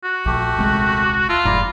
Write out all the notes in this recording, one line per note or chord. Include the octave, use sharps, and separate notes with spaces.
F#4
A#1 A3 G4
D#1 C2 G#3
F4 E5 A5 E6
F1 G#2 E4 D5 A#5